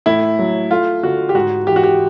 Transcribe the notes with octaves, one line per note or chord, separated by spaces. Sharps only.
A2 E4
F#3
A3 F4
D3 F#4
G4
G#2 F#4
E3 G4
F#4
G4